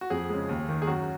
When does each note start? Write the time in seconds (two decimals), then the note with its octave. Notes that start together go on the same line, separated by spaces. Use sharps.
0.01 F#4
0.10 F2 G#4
0.29 C#3 G#3
0.49 D#2
0.68 D#3 A#3
0.82 G#4
0.87 F#2 F#4